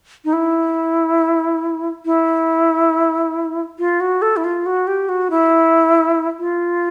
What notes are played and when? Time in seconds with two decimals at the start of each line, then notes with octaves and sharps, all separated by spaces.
0.25 D#4
0.33 E4
2.05 E4
3.79 F4
4.00 F#4
4.22 A4
4.37 E4
4.44 F4
4.66 F#4
4.87 G4
5.09 F#4
5.30 E4
6.39 F4